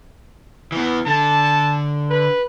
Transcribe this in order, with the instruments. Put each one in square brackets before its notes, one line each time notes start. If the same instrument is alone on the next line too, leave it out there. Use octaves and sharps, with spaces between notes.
[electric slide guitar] E3 B3
[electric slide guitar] D3 [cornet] A5
[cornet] B4